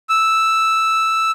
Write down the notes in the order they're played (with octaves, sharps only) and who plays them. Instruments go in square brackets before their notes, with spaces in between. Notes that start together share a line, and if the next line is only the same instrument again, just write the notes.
[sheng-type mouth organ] E6